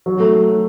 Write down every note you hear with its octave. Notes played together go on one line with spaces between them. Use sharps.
F#3
A3